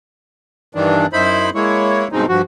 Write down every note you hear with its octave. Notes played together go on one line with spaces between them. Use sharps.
G2 D#3 E3 D4
F#2 D#4 E4 C5 B5
G#3 A#3 E4 C#5
G2 B2 G#3 C4 D#4
G2 F3 F#4